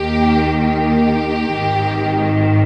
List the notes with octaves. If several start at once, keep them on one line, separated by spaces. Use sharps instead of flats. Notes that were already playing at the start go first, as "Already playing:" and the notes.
Already playing: D#2 D#3 A#3 G4
G4
G#1 G#2 D#3